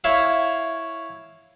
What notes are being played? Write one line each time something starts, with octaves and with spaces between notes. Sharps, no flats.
E4 C#5 E5 F5